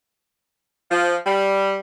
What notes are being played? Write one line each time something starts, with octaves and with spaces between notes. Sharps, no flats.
F3
G3